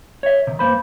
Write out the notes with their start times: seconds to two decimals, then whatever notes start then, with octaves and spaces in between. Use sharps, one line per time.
0.23 C#5 E5
0.47 C3 D#3
0.59 G2 D#3 A#3 C5 B5